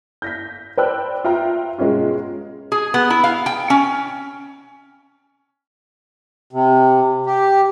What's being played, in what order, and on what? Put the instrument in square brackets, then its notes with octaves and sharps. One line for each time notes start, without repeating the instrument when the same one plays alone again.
[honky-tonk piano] G6 A#6 B6
B4 C5 D5 G5 E6 F#6
F4 E5 G5 A#5
B2 G#3 B3 C#4 F4
[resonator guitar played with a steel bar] G#4
B3
E4
F5
G5
C#4
[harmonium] C3
G4